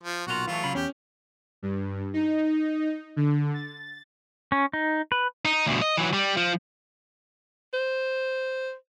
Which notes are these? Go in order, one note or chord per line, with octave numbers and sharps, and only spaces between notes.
F3
B1 A#2 F4 F#4
E3 F#3 A3 F4
C#3 F#3 B5
E2 C#4 G4
G2
D#4
D3
A6
C#4
D#4
B4
D#4
D2 B2
D#5
E3 F#3
G3
F3
C5